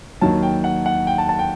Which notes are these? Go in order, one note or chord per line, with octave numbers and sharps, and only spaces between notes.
D#2 D#3 F#3 A5
G5
F#5
F#5
G5
A5
A5
G5